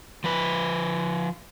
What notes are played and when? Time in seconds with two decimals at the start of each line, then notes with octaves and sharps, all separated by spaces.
0.24 F3 B4